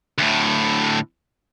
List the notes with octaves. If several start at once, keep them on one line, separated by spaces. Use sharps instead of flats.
D2 A2